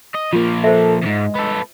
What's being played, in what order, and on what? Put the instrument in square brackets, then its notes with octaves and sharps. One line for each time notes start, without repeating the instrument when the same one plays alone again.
[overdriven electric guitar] D#5
[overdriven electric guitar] F3 A#3 [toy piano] F4
[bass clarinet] A4 [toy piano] C5 E5
[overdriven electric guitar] E2 G#2 [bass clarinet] G#3
[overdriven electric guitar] B3 A4